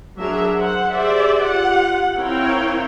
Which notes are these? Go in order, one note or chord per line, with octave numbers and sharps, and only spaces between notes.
F#3 D4 G#4 A#4 E5
C5 F#5
G4 G#4 C5 D5 E5
F4 G4 F#5
C4 E4 A#4 C#5 F5 G5